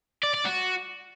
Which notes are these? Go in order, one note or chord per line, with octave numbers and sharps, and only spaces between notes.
D5
D5
F#4